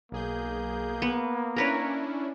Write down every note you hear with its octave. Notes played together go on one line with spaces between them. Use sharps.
B1 A#3 G#4 G6
B3
C#4 D4 E4 A#4 B4 C#5